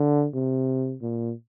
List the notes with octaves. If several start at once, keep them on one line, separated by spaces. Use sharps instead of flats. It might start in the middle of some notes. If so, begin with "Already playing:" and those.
Already playing: D3
C3
A#2